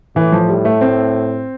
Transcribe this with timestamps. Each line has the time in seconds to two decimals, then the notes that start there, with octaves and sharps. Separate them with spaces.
0.16 A2 E3
0.32 F3
0.49 G3
0.65 A3
0.81 C4